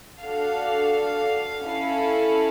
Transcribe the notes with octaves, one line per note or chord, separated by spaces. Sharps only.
D4 F#4 A4 F5
C#4 E4 A4